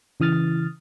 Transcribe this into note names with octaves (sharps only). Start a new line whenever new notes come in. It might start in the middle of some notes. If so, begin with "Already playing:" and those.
C#3 E3 D#6 F6 A6